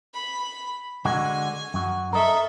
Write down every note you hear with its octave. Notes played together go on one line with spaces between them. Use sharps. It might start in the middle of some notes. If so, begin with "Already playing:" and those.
B5
D3 G#3 F#4 G#5
F#2 F#4
A4 A#4 D#5 E5